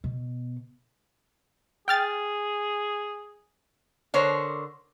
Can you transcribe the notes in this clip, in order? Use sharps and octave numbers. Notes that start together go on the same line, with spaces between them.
B2
G#4 G5 F6 A6
D3 A#4 C5 C#5